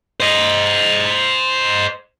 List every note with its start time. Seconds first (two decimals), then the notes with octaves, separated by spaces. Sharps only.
0.20 C5 D#5